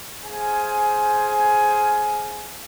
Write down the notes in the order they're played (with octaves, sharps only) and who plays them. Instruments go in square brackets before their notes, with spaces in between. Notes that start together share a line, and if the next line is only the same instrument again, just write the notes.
[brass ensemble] G#4 C5 F5 G#5